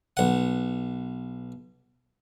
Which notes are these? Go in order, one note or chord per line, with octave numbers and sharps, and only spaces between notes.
B1 F#5